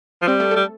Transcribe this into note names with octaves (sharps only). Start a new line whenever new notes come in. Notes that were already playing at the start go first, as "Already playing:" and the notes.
F3
G3 C4
A3
G3 A4